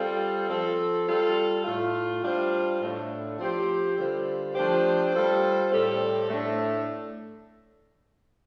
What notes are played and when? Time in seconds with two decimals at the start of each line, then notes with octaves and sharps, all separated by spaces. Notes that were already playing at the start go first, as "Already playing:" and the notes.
Already playing: G3 C4 F4 A4
0.49 F3 C4 A4
1.07 G3 F4 A4
1.65 A2 A3 F4
2.23 G3 D4 F4 C5
2.81 A2 A3 D4
3.39 F3 C4 G4 C5
3.96 D3 G3 F4 C5
4.54 F3 A3 D4 G4 C5
5.13 G3 F4 A4 C5
5.71 A2 G3 C4 A4
6.29 A2 A3 D4